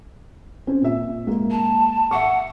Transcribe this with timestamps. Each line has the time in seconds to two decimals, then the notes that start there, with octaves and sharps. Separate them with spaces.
0.67 C4 C#4
0.82 A#2 E5
1.27 G#3 A#3
1.50 A5
2.11 E5 F#5 C#6